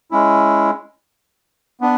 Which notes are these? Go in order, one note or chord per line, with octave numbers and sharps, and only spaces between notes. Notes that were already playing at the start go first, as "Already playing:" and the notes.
G#3 C#4 E4
B3 D4